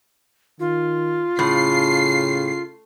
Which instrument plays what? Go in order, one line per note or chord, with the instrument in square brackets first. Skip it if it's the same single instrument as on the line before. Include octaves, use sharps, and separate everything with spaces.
[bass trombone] D#3 [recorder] F4
[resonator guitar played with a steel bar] A2 [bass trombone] C#3 [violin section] C7